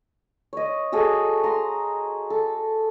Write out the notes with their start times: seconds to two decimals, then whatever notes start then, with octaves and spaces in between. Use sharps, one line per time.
0.53 C#5 D#5
0.92 F#4 G#4 A4 D#5
1.44 A#5 C6
2.30 A4